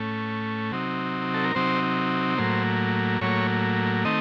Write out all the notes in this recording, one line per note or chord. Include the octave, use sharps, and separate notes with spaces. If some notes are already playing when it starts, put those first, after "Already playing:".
Already playing: A2 A3 C#4
C3 F#3 C4 D#4
A4
A#4
C3 F#3 C4 D#4 C5
A2 F#3 A#3 C5
A2 F#3 A#3 C#5
D#3 A3 C4 D#5